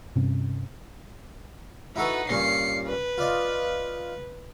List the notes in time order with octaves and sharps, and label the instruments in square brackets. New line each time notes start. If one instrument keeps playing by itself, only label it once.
[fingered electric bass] G2 C3 C#4
[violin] D#4 B4 [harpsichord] E4 F#4 A4
[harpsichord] G2 A#2 C#4 [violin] C7 C#7
[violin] B4
[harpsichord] F4 D5 D#5